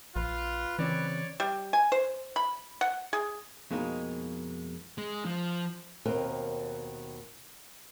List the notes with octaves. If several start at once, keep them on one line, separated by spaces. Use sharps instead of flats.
A#1 F4 B4
C#3 E3 C4 C#5 D5
G3
G#5
C5
B5
F#5
G#4
F2 B2 G#3 A#3 D#4 D#5
G#3
F3
D#2 B2 C4 A#4